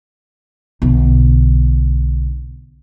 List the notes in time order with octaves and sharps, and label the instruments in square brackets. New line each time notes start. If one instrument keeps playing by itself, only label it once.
[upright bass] B1 D3